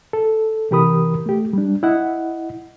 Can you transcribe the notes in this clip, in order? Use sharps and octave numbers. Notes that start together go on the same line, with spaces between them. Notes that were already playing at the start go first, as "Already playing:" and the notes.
A4
C3 E3 G4 A#4 B5 D#6
A3 G4
G3 D4
E4 D#5 F#5